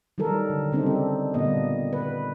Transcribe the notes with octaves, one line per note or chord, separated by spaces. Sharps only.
D#3 F#3 G3 A4 A#4
D3
C#3 G3 C4 D4 D#4
A4
A#2 D3 G3 A#3 B3 D#5
B4